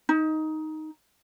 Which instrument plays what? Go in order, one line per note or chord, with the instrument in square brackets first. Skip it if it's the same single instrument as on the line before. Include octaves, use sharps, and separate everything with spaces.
[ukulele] D#4